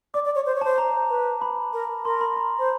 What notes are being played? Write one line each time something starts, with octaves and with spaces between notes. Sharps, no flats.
D5 D6
D5
C#5
C5
C#5
C5 A5
A#5
B4
B5
A#4
A#4 C6
B5
A#5
C5